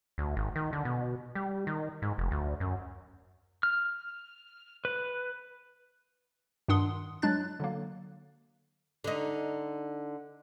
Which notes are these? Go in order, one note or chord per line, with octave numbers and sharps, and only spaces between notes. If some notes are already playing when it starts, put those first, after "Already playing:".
D2
G#1
D#3
D3
B2
G3
D#3
G#2
F1
D2
F#2
F6
B4
G2 D#3 D4 F#5 C6 D#6
F#3 G#3 D4 F#6 A6
D3 F#3 A#3
D3 D#4